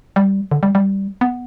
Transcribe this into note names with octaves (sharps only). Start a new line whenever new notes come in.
G3
D3
G3
G3
B3